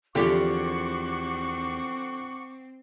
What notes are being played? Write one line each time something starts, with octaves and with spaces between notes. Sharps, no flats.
E2 D3 F3 C4 G4 F#5 C#6 D6